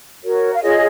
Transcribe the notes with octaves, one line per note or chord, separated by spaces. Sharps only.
F#4 A#4 C#5
F5
F4 G#4 C#5 D#5